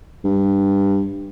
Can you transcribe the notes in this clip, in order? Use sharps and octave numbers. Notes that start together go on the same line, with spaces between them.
G2